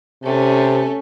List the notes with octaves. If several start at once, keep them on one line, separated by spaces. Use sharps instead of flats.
C3 A3 C#4